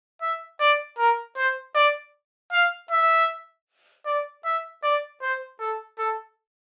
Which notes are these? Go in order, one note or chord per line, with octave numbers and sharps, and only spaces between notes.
E5
D5
A#4
C5
D5
F5
E5
D5
E5
D5
C5
A4
A4